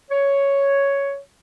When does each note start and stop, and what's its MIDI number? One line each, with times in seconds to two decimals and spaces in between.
0.11 1.17 73